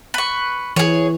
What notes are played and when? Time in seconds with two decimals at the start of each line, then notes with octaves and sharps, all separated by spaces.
0.14 B4 C#6
0.76 E3 G#4 C#5